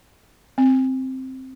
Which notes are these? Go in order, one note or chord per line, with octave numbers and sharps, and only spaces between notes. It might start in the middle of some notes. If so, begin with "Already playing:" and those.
C4